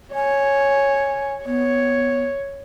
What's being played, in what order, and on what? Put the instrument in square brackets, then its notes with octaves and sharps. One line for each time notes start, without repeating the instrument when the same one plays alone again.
[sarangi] C#5 [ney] G#5
[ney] B3 [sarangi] C#5